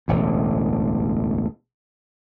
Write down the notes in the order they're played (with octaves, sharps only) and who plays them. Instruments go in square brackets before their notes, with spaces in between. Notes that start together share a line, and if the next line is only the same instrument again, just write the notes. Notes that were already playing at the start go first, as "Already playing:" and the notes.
[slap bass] E1 A1 D2